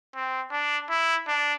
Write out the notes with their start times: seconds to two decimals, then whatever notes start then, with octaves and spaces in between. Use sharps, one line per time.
0.15 C4
0.52 D4
0.90 E4
1.28 D4